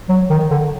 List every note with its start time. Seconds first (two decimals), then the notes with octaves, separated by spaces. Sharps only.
0.09 F#3
0.30 D#3
0.51 D3